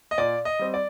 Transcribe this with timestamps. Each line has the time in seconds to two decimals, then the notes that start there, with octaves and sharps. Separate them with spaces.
0.11 D#5
0.18 A#2 D5
0.45 D#5
0.59 G3 C4
0.74 D5